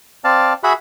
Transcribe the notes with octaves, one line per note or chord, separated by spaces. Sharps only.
C4 D5 F5 A5
F#4 G#4 E5 F#5 B5